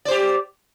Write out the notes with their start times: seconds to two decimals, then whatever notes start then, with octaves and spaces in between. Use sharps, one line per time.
0.05 D5
0.08 C5
0.11 G4